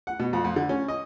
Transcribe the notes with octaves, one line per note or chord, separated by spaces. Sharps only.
F#5
B2
F2
F2
D3
C#4
D#5